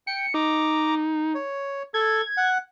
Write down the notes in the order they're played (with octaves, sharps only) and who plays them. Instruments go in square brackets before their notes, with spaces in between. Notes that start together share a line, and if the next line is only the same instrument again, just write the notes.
[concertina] G5 [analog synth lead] C#7
[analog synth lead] D#4 [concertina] A#5 D6
[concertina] C#5
[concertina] A4 [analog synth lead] G#6
[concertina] F#5